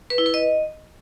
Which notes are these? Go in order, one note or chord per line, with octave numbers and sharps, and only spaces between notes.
B4
E4
B4
D#5